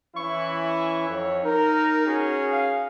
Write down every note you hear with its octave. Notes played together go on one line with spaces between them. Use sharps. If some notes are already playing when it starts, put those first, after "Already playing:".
E3 C#4 E4 C#6
C#6
F2 C#5
D#4 A#4
C#4 F#4 G#4
F5